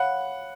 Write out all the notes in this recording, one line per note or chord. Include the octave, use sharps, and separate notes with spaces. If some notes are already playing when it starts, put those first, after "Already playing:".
Already playing: C#5 F5 F#5 B5